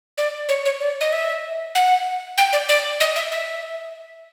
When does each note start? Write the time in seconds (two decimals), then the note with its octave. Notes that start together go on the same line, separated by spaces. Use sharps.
0.18 D5
0.49 C#5
0.65 C#5
0.80 D5
1.01 D#5
1.13 E5
1.75 F#5
2.38 G5
2.53 D5
2.69 D5
3.00 D#5
3.16 E5
3.32 E5